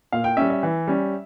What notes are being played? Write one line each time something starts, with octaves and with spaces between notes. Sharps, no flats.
A#2 F5
G5
G3 C#4 E5
E5
E3
G3 C#4